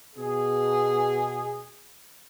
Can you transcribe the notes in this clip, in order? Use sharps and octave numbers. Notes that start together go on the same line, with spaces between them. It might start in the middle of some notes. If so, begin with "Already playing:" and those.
B2 G#4